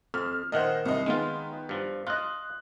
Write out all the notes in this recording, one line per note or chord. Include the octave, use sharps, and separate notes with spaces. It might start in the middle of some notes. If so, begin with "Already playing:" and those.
F2 F6
A#2 D#3 C5 D#5 F#5
C2 D#5
D#3 G#3 B3 F4
G2 F3
F4 D#5 F#6